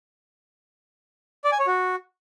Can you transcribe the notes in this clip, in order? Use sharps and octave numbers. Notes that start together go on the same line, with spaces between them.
D5
G#5
C#5
F#4